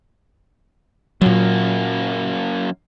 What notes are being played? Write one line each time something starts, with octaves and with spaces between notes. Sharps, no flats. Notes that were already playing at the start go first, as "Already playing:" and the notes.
F#2 A#2 F#3 A#3